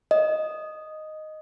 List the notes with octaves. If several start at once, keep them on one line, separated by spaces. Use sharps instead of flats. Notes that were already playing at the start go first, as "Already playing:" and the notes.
D#5